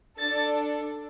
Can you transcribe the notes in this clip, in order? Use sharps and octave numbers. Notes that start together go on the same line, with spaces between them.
D4 A4 A6